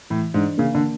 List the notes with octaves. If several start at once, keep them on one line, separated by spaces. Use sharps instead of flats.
A2 E3
G#2 D4
C#3 A#3
D3